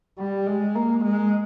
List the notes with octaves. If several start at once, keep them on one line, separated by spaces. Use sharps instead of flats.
G3
G#3
A#3
G#3